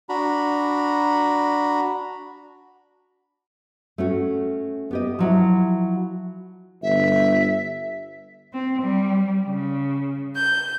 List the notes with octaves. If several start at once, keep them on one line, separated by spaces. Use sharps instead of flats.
D4 F#4 A#5 B5
A3 C#4 F#4
B3 G4 D#5
F3 F#3 E4
G1 E5
C4
G3
C#3
G6